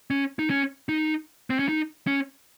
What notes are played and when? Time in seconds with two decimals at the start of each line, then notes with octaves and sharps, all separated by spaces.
0.10 C#4
0.39 D#4
0.50 C#4
0.89 D#4
1.50 C4
1.59 C#4
1.69 D#4
2.07 C#4